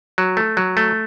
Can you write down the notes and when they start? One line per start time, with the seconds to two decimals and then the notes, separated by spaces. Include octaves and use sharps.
0.18 F#3
0.37 A3
0.57 F#3
0.77 A3